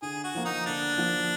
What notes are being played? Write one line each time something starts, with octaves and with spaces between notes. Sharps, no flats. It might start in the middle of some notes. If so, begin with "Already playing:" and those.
D3 G#4
F#4
F3 A#3
D#4
D3 D4
F3 A#3